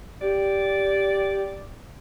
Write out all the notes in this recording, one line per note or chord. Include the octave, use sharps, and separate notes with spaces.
G4 D5